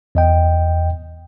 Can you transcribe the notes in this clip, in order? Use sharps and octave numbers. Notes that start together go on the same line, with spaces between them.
E2 D#5 G5